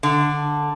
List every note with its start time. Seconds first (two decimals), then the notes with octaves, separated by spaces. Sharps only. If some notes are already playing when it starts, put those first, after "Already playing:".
0.03 D3